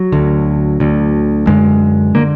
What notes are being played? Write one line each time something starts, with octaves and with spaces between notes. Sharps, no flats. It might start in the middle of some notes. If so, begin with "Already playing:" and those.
Already playing: F#3
D2 D3
D2 D3
F#2 D3 G#3
D3 A#3